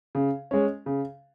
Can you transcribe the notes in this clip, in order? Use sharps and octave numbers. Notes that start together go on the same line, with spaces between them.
C#3
G#3 C#4
C#3